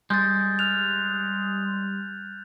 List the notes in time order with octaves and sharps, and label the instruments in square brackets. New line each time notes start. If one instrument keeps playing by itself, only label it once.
[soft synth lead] G3 [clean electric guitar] G#3 [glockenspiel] G6 A6
[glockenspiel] F6 F#6 F7